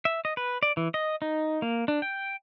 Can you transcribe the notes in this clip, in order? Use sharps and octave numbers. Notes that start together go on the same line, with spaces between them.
E5
D#5
B4
D5
E3
D#5
D#4
A#3
D4
G5